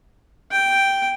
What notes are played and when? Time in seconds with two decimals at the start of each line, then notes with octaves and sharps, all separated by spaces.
0.51 G5